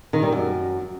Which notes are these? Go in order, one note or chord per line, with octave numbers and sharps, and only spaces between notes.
D#3
G3
F#2